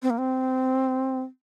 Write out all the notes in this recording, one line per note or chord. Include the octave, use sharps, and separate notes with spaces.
C4
A#3
C4